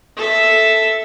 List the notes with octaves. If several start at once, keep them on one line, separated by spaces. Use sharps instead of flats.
A4 E5